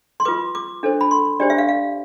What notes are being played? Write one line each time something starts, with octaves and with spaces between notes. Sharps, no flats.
C6
F4 B4 D6
D6
D4 A4 C5
B5
C6
D4 G4 C5 D5
E5
F5
F5